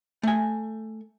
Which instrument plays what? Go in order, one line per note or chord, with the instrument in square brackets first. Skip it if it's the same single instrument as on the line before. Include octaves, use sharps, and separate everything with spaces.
[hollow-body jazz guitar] A3 G#5